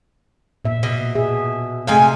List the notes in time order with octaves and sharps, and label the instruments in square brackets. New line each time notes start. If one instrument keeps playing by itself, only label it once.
[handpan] A#2 E5
[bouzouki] B2
[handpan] G#4 E5
[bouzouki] C3 G#3 G#5 [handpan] A3 F5